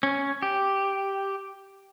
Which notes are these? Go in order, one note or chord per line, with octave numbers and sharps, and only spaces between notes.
C#4
G4